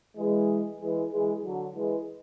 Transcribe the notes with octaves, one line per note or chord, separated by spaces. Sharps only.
E3 G#3
E3 G#3
E3 G#3
D3 F#3
E3 G#3